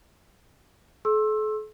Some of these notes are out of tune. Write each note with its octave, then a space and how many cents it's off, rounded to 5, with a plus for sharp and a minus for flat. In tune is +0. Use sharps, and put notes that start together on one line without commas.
A4 -45 C6 +40 E6 +0